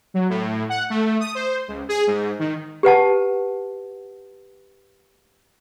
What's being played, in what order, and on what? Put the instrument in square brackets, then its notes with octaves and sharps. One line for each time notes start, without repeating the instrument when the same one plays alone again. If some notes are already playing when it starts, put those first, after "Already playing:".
[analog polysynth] F#3
A2
F#5
A3
D#6
C5
C#2
G#4
G#2
D#3
[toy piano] G4 B4 F#5 A5